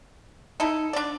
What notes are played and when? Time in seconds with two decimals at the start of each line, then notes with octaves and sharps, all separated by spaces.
0.60 D#4 E4 A4
0.93 D4 D5